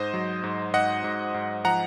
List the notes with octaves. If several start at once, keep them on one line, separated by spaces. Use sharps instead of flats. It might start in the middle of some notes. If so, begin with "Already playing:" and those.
Already playing: G#2 C5 D#5
F#3
G#2
G#2 D#5 F#5
G#2
G#2
F3 F#5 A#5